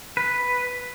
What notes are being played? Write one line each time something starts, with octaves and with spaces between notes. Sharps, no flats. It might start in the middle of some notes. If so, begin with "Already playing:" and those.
B4